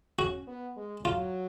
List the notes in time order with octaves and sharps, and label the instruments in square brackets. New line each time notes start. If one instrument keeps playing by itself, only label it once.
[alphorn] C#4 [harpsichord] F#4
[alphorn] B3
G#3
[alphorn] F#3 [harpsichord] F4